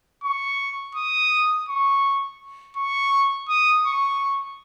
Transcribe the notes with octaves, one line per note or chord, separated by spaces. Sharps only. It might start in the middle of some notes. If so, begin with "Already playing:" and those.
C#6
D#6
C#6
C#6
D#6
C#6